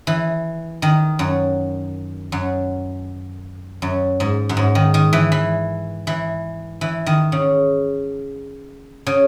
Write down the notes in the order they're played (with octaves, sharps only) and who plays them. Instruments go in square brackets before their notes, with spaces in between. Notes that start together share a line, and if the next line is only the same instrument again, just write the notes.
[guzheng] E3
D#3
F#2
F#2
F#2
G#2
F#2
G#2
D#3
D#3
E3
E3
E3
E3
D#3
C#3
C#3